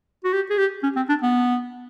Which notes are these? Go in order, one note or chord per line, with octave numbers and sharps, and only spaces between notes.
F#4
G4
G#4
G4
C#4
C4
D4
B3